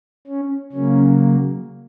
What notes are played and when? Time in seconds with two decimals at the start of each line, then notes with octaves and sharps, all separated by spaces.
0.27 C#4
0.72 C#3 F#3 A#3 C#4